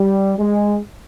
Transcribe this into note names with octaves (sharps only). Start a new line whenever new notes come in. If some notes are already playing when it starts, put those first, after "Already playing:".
Already playing: G3
G#3